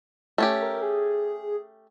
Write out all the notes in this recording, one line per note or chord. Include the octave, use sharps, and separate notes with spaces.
A3 C#4 G4
A#4
G#4